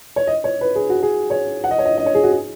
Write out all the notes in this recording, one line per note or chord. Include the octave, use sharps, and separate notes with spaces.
C#5
D#5
C#5
B4
G#4
F#4
G#4
C#5
F#5
D#5
C#5
D#5
D#5
C#5
G#4
F#4
G#4